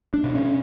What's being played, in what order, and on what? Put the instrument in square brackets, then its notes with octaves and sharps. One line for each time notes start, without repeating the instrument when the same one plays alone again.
[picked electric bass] D4
B2
C#4